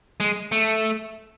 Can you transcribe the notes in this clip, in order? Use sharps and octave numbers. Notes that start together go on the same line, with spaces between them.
G#3
A3